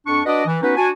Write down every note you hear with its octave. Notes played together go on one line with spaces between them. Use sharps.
F2 D4 C#6
D4 F#4 B4 D5 D#5
E3
B3 C#4 D#4 F#4 B4
D4 F#4 G#5 A5